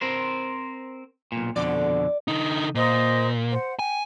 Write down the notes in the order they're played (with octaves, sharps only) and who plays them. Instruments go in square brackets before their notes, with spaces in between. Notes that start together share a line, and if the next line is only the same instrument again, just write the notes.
[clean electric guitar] C4 A#4 C5
B1 A#2
[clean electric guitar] F2 B2 D3 [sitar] D5
[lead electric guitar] D3 D#4
[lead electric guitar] A#2 [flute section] C5 D#5
[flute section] C5 F#5
[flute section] G5 [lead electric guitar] G#5